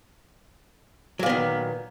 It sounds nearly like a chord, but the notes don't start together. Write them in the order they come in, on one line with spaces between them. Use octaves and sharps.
F#3 A#2 B3 D#3